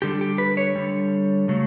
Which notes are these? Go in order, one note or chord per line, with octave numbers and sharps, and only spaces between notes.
D3 G3 G4
G4
B4
C#5
D3 G3
C#3 F#3 A3